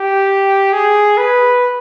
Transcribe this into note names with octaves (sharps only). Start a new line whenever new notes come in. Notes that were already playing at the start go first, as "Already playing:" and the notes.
Already playing: G4
G#4
B4